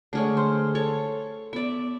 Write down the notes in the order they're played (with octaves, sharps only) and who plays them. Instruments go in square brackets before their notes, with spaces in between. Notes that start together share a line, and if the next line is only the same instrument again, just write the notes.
[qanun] D3 G#3 C#5 [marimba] A3 F6
[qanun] C5 [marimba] C6 F6
[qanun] A4 C#5
[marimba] B3 [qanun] D5 E5